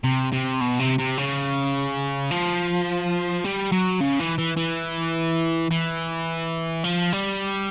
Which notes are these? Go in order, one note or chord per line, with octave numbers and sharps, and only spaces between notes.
C3
C3
B2
C3
C3
C#3
F3
G3
F#3
C#3
E3
E3
E3
E3
F3
G3